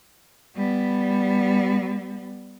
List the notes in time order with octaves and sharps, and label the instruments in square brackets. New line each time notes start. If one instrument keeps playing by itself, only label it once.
[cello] G3 B3